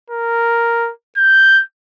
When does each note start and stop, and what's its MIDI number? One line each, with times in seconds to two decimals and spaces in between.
0.10 0.91 70
1.17 1.62 91